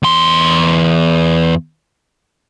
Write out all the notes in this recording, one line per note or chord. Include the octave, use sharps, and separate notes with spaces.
E2 C6